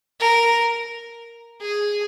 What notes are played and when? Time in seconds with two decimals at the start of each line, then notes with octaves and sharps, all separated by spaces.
0.20 A#4
1.60 G#4